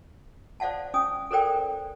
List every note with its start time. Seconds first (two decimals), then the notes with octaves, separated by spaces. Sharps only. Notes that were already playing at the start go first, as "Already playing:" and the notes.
0.60 C5 D5 F5 F#5 A5
0.94 C#4 G#5 D#6
1.31 A4 A#4 C5 D5 G5